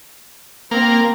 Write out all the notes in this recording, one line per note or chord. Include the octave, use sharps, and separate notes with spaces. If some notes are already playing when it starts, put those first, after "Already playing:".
A#3 C4 A#5